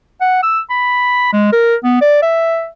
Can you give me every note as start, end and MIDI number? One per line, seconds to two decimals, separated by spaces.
0.21 0.42 78
0.43 0.60 88
0.70 1.31 83
1.33 1.50 56
1.52 1.75 70
1.84 1.97 59
2.01 2.21 74
2.22 2.68 76